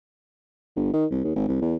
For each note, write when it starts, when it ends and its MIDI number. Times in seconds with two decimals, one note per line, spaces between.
0.76 0.92 31
0.93 1.06 51
1.11 1.20 36
1.24 1.32 39
1.36 1.47 32
1.48 1.57 36
1.61 1.75 40